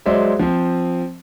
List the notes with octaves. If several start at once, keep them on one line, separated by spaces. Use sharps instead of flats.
F#3 G#3 C5 D5 E5
F3 C4